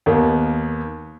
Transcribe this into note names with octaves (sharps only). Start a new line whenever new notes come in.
D#2 D#3 A#3 B3